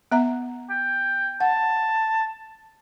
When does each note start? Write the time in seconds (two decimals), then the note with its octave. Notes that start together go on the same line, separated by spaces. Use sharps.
0.12 B3 E5 A#5
0.70 G5
1.40 F#5 A5